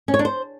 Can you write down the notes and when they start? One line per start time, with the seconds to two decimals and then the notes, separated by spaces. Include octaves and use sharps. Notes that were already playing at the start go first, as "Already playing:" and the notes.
0.08 C#4
0.14 C#5
0.19 D4
0.25 C5